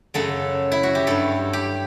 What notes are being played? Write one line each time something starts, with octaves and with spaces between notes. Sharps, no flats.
F#2 C#3 F#3 A4
E4
F#4
G4
G2 F#3 A4
G4